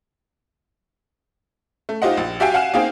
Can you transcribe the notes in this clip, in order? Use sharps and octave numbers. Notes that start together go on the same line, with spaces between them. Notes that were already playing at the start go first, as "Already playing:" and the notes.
A3
D#4 F4 G4 C5 D#5 F#5
A#1
F#4 G4 E5 F5 G5 G#5
F5 F#5 G#5 F6 E7
A#3 C4 D#4 G#4 F5 G5